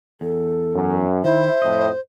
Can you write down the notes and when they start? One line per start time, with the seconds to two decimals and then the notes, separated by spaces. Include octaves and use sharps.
0.21 E2 A4
0.74 F#2
1.24 D#3 E4 C5 E5
1.62 F2 A2 D#5